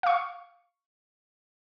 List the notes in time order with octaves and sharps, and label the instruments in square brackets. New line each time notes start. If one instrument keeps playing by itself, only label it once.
[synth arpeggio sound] F5 C#6